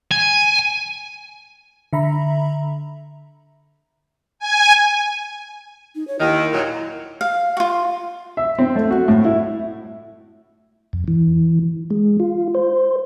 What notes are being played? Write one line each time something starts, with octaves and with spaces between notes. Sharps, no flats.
G#5
D3 E5 A#5 B5
G#5
D#4
C#5
D#2 D#3 E4
A#2 F#3
F5
F4 F#4
E5
C4
A3
F#4
A2
E4
F2
E3
G#3
F4
C5